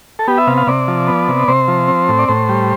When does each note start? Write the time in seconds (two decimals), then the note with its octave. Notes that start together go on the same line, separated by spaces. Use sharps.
0.19 A4
0.28 B3 G4
0.38 E5
0.47 C3 F5
0.57 F5
0.67 C3 D5
0.88 F3
1.08 B3
1.28 C3
1.48 C3 C5
1.68 F3
1.88 C4
2.08 A2
2.19 D5
2.28 A2 C5
2.49 G3